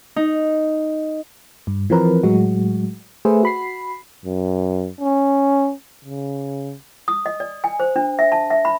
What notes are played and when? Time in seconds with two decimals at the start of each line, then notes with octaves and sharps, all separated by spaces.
0.16 D#4
1.67 G2
1.90 E3 F3 C4 A#4 B4
2.23 A2 F#3 G#3 F#4
3.25 A3 G#4 B4 C5 E5
3.43 F#4 B5 C7
4.25 F#2
5.01 C#4
6.05 C#3
7.08 D#6
7.26 D#5
7.40 D5
7.64 G#5
7.80 C5
7.96 D4
8.19 E5
8.32 A5
8.50 E5
8.65 B5